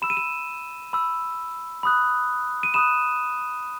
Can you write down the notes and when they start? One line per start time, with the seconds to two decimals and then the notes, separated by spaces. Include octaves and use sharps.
0.02 B5 E6 E7
0.10 D#7
0.17 E7
0.93 B5 E6
1.83 B5 D#6 F#6
2.63 D#7
2.74 B5 D#6 F#6 E7